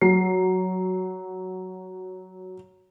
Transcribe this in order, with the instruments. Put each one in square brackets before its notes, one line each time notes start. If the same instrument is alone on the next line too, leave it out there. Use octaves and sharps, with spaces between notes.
[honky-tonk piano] F#3 C7